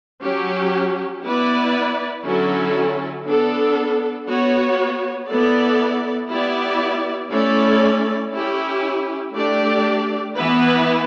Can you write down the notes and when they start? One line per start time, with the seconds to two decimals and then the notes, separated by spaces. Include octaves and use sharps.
0.22 F#3 C#4 G4
1.23 B3 E4 B4 D5
2.25 D3 F#3 C#4 E4 A4
3.27 B3 D4 A4
4.28 B3 F#4 C#5
5.29 B3 E4 A4 D5
6.31 B3 E4 G4 D5
7.32 A3 C#4 E4 A4 D5
8.33 C#4 E4 G4
9.34 A3 D4 G4 D5
10.36 E3 B3 E4 B4